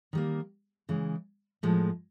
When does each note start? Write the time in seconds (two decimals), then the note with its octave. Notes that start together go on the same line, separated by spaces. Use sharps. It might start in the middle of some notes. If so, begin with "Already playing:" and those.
0.13 D#3 G3 A#3
0.89 C#3 E3 G#3
1.63 A2 F3 G#3